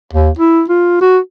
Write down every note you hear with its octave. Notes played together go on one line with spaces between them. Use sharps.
D#2
E4
F4
F#4